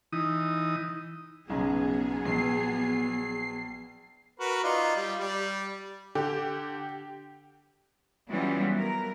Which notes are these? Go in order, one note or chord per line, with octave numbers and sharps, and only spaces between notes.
E3 D#4 D#6
B1 F#2 C#3 F#3 B3 G#4
A#1 C7
F#4 A#4 B4
D#4 F4 D5
G3
G3
D3 G4
E3 F#3 G3 B3 C#4 F4
A#4